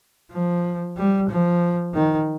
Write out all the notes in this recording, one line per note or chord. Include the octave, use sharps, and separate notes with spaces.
F3
G3
F3
D#3